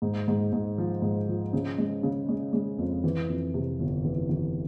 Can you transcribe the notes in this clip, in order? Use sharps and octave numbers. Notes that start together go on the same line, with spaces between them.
G#2
G#2
G#2
F3
G#2
F3
C#3
G#3
C#3
G#3
G#3
F2
E3
F2
C3
G1
E3
E3